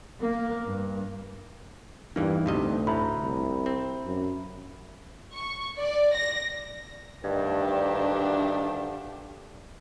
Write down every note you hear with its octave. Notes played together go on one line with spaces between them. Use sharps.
A#3
G2
E2 G2 E3 A#3 D#4
D2 G2 C3 D#5
A2 E5 A#5 B5
C2
C4
F#2
C#6
D5
A#6
D2 G2 D#3 D4 G4